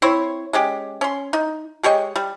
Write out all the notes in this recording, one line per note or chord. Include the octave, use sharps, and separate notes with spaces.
C4 E4 C5 C#5
G#3 C#4 G4
C#4 C6
D#4
G#3 G4 C#5 D#5
G3